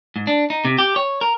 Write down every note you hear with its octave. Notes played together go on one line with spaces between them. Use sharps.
G#2
D4
D#4
C3
G4
C#5
A#4